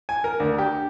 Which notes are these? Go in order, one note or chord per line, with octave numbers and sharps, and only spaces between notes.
G#5
A#4
D2
G4